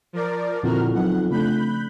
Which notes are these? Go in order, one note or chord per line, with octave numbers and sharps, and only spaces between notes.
F3 A#4 D5
F2 A#2 D3 E4 F#4 A#4 F6
F#3 B3 D#4 F#5
C#3 A3 D4 B5 F#6 G6